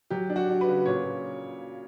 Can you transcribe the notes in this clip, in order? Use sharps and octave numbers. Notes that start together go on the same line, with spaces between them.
F#3 G4
D4
F#4
D4
B4
C#3
A#2 C#5
A#2